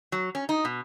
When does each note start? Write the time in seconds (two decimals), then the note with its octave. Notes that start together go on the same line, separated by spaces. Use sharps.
0.12 F#3
0.35 C#4
0.49 D#4
0.65 B2